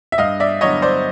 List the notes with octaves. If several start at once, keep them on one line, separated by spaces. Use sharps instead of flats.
E5
G2 D#5 F5
D5 E5
D3 F#3 B3 C#5 D#5
C5 D5